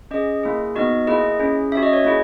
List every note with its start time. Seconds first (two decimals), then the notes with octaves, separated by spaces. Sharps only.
0.11 C#4 G#4 D#5
0.43 A#3 E4 G#4
0.76 B3 D#4 F#4 D#5
1.07 A#3 E4 G#4 D#5
1.40 C#4 E4 G#4
1.72 C#4 E5
1.77 F#4
1.83 D#5
1.93 C#5
2.04 A#3 E4 G#4 D#5